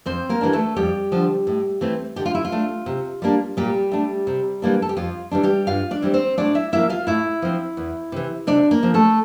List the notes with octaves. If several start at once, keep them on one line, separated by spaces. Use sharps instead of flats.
F2 C4 C5
A#3 A#4
E3 G3 A#3 D4
A3 A4
F2 G3 G4
D3 F3
A2
E3 A3 C4
D3 G4
F4
E4
F4
A3 D4
C3
G3 A#3 D4
A#2 G3 G4
A3 D4
C3
E3 G3 A#3 D4
A4
G4
F2 F4
E3 G3 D4
G3 G4
G2 F4 F5
D4 D5
E3 G3 C4
C4 C5
A2 D4 D5
E4 E5
F3 A#3 E4 E5
F4 F5
A2 E4 E5
F3 C4
E2
C3 E3
C3 D4 D5
A#3 A#4
F3 C4
A3 A4